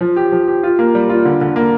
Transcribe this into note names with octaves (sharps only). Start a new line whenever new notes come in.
F3
G4
F3
G4
F4
A#3
G3
F4
D3
D3
A#3